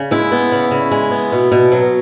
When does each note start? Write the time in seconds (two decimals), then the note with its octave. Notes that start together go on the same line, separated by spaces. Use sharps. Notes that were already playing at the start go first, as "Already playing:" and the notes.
Already playing: C#3
0.11 G#3 E4
0.32 B3
0.52 C#3
0.71 C#3
0.91 G#3
1.11 B3
1.32 B2
1.52 B2
1.72 F#3